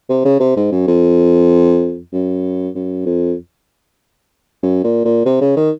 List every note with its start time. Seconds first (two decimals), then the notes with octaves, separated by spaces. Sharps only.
0.09 C3
0.25 C#3
0.40 C3
0.56 G#2
0.72 F#2
0.87 F2
2.13 F#2
2.75 F#2
3.06 F2
4.63 F#2
4.84 A#2
5.05 A#2
5.25 C3
5.41 C#3
5.56 D#3